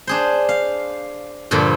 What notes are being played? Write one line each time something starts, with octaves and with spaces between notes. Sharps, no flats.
D4 G#4 C5
F5
G2 A#2 D3 F3 G3